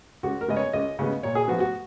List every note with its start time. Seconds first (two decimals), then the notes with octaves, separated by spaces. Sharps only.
0.23 C#2 F#4
0.41 A#4
0.48 C#3 G#3 B3 D#5
0.56 C#5
0.73 C#2 D#5
0.99 C#3 G#3 B3
1.23 A#2 C#5
1.35 G#4
1.48 F3 B3 F#4
1.60 F#4